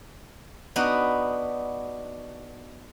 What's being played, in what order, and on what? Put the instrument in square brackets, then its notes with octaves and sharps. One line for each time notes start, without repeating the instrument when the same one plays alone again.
[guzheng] B3 D4 D#4 F#4 B4